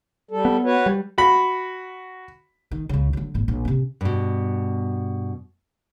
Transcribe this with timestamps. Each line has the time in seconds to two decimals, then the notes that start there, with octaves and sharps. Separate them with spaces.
0.31 G3 A4
0.45 B3
0.64 F#4 B4 C#5
0.86 G3
1.18 F#4 B5
2.71 D#3
2.89 C#2 C#3
3.13 D3 F#3
3.34 G#1 A#2
3.48 A#1
3.65 C3 C#4
4.01 G2 B2